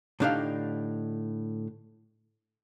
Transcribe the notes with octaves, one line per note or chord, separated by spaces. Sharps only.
A2 D3 D4 D#4 G4 F5